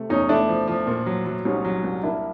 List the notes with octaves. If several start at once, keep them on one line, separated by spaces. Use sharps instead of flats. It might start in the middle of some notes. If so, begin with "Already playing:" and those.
Already playing: C3 A3
E2 C#4 D#4
A3 D4 E4
F3
F3
A#2
F#3
F#3
C2 C#4 D#4
F#3
C2
A#3 D4 E4